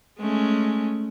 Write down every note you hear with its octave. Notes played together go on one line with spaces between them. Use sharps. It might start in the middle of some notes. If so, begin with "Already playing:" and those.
G#3 A3 C#4